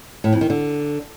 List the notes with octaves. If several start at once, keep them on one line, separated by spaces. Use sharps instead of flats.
A2
F2
D#3
D3